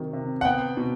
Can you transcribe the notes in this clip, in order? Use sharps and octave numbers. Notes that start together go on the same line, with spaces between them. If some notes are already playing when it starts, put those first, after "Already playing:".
Already playing: C3 D#3 F#3
C3
F#5
B3 G5
B2